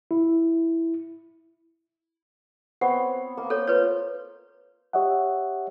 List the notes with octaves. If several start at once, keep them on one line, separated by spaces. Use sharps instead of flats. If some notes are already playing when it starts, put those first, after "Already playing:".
E4
B3 C4 C#5 F#5
A#3
A4 C#5
F4 B4 C#5 F5
G4 C#5 D#5 E5 F#5